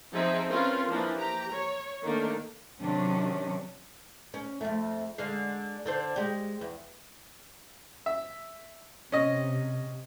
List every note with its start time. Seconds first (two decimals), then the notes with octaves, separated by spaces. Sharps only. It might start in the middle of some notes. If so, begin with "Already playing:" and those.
0.14 F3 C4 D#4 G#4 E5
0.50 C4 C#4 F4 A#4 B4
0.89 E3 F3 A#3 D4
1.18 G4 A#5
1.52 C#5
2.03 D#3 A3 A#3 D4
2.79 C3 D#3 F#3 C#4 D4
4.34 C#4
4.61 F2 A3
5.18 D3 G#3 F5
5.86 D3 D4 C5
6.16 G#3 G4
6.61 E2
8.06 E5
9.12 C3 C#4 D#5